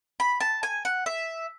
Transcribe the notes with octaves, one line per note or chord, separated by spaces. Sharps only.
B5
A5
G#5
F#5
E5